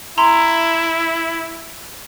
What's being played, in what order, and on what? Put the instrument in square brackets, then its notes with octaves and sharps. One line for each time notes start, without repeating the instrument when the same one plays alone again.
[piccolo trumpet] E4 [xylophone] A#5 C6